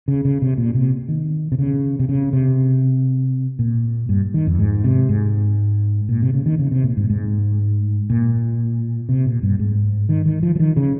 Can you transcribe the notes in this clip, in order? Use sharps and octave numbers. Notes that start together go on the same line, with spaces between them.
C#3
C#3
C3
A#2
C3
D#3
C3
C#3
C3
C#3
C3
A#2
G2
D#3
F2
G#2
C3
G#2
A#2
C3
C#3
D#3
C#3
C3
A#2
G#2
G#2
A#2
C3
A#2
G2
G#2
D#3
D#3
F3
F3
D#3
C#3